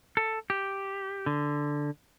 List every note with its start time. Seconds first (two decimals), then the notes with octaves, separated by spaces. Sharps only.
0.17 A4
0.50 G4
1.26 D3